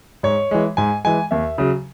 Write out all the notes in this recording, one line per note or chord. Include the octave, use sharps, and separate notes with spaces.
G#2 C#5
E3 G#3
G#2 G#5
E3 G#3 G#5
D#2 E5
C#3 F#3